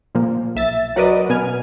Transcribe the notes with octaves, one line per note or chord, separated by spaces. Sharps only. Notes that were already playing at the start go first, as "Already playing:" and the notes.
A#2 F3 A#3
B1 E5 A6
F#3 F#4 A#4 B4 D5 D#5
B2 B3 G#5 F6